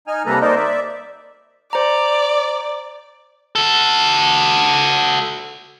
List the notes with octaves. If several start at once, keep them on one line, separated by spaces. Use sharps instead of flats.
D#4 G#5 F6
C3 G3 A#3 A4 B4 A#5
A#3 D#4 A#4 C5 D5 D#5
D5 E5
C5 D5 A#5
F#4 A4